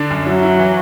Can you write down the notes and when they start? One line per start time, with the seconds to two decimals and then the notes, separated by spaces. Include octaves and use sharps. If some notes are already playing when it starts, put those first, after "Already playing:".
Already playing: D3 D4
0.10 F#2
0.26 F#3 E4
0.43 E4
0.59 E3